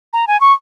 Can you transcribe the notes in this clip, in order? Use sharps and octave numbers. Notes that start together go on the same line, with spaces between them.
A#5
G#5
C#6